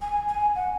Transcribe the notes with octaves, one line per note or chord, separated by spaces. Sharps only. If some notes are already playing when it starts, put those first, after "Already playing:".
G#5
G#5
F#5